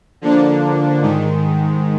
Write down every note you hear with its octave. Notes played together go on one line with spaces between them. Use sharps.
D3 F3 A#3 D4
G#2 D#3 G#3